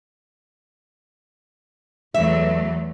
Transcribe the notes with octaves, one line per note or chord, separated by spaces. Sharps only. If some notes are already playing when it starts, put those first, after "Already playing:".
E2 F#3 A3 E5